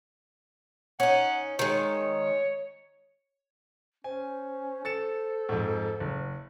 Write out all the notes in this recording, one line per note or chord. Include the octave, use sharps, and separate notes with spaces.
C#4 D#4 F#5
D#3 G#3 C#5
C#4 C5 G#5
A4 A6 C#7 E7
F2 G#2
F#1